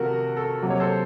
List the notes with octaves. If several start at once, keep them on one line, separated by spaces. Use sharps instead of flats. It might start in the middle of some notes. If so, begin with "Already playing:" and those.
Already playing: C3 F3 A3 F#4 A#4
A4
C3 F#3 A#3
C#5
A4 C5